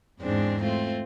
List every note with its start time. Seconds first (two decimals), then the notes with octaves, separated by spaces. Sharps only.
0.21 E2 G#2 G#3 C4 D4
0.62 A3 C4 F4